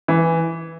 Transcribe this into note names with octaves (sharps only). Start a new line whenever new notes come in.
E3